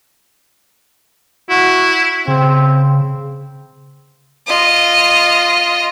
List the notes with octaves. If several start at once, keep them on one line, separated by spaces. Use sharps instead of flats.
E4 F#4
C#3 C4
F4 D#5